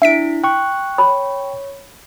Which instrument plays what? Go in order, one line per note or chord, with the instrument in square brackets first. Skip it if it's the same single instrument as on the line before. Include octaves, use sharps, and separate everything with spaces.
[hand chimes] D4 E4 [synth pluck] E5 B6 D7
[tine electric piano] G5 C#6 [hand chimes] F#6
[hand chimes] C#5 [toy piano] B5